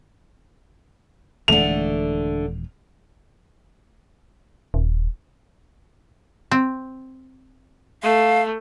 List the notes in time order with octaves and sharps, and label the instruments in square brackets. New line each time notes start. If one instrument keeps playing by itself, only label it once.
[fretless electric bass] D#1 E3 G#3 [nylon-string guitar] D3 A3 [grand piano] F7
[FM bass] D#1
[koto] C4
[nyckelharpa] A3 [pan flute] F5